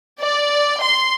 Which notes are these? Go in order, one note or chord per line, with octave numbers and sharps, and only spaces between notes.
D5
C6